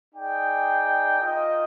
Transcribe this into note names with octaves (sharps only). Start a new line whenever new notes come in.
D#4 G#4 D5 G5
F4 A#4 D#5